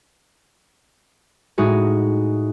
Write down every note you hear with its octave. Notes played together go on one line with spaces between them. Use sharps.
A2 G#3 D#4 F#4 G#4